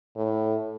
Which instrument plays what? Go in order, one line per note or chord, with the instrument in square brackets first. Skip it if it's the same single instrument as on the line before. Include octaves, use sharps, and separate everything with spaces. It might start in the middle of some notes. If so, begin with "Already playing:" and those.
[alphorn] A2